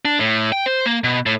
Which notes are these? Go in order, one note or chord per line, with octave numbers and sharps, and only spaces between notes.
D4
A2
G5
C5
A#3
B2
A2